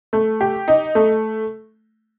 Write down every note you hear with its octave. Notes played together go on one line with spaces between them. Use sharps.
A3
G4
D#4
A3